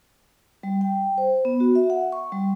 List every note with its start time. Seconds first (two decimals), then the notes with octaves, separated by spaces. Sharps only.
0.63 G3
0.81 G5
1.18 C5
1.45 B3
1.60 F#4
1.75 E5
1.90 F#5
2.12 C#6
2.32 G3